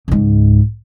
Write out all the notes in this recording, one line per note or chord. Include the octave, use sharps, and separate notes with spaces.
C#2 G#2